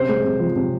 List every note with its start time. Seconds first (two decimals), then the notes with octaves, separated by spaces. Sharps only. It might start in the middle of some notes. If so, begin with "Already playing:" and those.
Already playing: C3 C#4 C5
0.09 G#3
0.24 C3
0.40 F3
0.56 C3